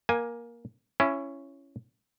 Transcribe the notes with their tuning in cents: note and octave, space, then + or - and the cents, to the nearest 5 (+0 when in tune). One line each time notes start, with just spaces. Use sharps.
A#3 +15 G#5 +0
C#4 +0 E4 +25